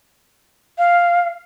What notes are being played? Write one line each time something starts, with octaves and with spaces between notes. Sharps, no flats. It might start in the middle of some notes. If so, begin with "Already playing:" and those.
F5